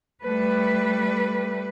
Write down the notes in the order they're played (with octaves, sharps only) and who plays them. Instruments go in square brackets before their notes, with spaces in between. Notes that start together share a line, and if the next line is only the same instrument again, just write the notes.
[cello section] G3 A3 B4